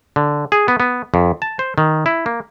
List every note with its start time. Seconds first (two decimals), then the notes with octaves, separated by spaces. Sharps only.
0.16 D3
0.52 G#4
0.68 B3
0.80 B3
1.14 F2
1.42 A5
1.59 C5
1.78 D#3
2.06 E4
2.26 A#3